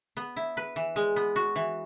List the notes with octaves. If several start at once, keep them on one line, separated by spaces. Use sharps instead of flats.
B3
E4
B4
E3
G#3
B3
F#4
E3